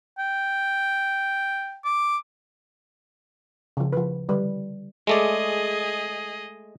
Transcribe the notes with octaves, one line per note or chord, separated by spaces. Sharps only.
G5
D6
C#3 F3
F3 B4
D3 G3 B4
G#3 A3 G#4 D5 D#5